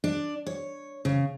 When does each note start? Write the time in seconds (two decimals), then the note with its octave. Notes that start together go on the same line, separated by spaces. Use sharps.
0.04 D4
0.47 C#5
1.05 C#3